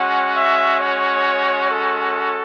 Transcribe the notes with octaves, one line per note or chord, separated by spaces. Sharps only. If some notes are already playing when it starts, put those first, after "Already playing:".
Already playing: G#3 C#4 F#4 F#5
E5
C#5
A4